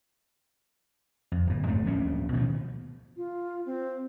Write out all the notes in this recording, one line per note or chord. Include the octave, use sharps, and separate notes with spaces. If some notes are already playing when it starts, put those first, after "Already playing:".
F2
G1 A#2
G2 A3 C4
D1 A#1 A#2 C#4
B2 D#3 F3
F4
C4